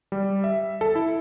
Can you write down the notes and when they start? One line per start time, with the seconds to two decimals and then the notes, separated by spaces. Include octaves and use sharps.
0.12 G3
0.44 E5
0.81 A4
0.95 E4